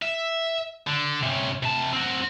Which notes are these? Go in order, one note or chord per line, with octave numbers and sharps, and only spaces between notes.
E5
D3
C3 C#4
C3 A5
C4 F#4